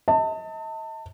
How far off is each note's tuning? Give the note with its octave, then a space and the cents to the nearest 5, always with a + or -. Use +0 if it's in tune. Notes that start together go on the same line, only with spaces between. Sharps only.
D#5 +40 A5 +30